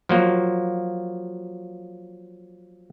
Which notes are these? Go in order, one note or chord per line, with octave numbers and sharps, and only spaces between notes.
F3 F#3 A#3